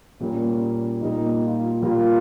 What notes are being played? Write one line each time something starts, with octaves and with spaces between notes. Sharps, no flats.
A#2 G3 A#3 C#4
A#2 G3 A#3 D#4
F4
A#2 G3 A#3 F4